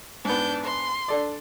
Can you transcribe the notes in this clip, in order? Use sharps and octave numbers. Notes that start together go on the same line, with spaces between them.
G#2 B3 D4 G6
C6
D4 A4 D5